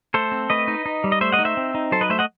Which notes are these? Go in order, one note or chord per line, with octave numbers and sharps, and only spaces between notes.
A3 A4 C5
C4
A3 B4 D#5
D#4
D#4
G3
D#5
A3 C5 E5
D#5 F#5
D#4
C5 E5
C4
D#4
F#3 A4 C5
B4 D#5
A3 C5 E5
D#5 F#5